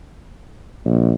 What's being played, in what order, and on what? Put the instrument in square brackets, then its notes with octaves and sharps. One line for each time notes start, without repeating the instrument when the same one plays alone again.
[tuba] A#1